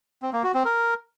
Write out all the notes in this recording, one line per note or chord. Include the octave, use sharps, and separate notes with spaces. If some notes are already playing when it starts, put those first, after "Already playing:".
C4
A#3
F#4
C4
A#4